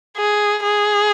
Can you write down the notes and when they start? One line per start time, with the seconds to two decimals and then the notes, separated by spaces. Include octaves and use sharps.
0.17 G#4
0.63 G#4